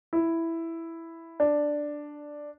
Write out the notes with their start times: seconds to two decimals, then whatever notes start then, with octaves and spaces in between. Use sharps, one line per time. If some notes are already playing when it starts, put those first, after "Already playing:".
0.13 E4
1.40 D4